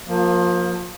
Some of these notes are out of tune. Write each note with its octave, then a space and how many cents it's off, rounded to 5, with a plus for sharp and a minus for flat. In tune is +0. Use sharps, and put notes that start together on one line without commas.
F3 +25 A#3 +0